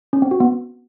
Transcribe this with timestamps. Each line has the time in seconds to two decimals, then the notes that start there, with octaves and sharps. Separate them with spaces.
0.13 C#4
0.22 C4
0.31 F#4
0.40 B3